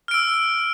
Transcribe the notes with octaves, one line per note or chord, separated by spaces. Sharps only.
E6 F6 D7